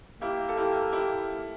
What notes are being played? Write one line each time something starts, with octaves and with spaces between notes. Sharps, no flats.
A#3 E4 G4
A4
E4 G4
E4 G4